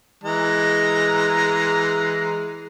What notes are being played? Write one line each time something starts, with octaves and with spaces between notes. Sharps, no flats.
E3 G#3 A#5